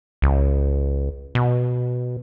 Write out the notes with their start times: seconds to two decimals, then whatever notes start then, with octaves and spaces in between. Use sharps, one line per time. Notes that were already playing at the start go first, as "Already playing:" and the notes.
0.22 C#2
1.35 B2